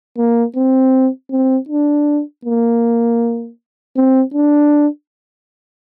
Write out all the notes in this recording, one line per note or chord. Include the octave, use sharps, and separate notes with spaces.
A#3
C4
C4
D4
A#3
C4
D4